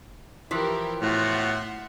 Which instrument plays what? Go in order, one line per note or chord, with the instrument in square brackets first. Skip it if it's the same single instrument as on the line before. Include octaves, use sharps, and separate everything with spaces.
[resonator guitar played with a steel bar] E3 F3 [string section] E4 G4 A#4
[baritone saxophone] A2 [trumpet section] B3 F4 F#4 [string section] E5 F#5 C6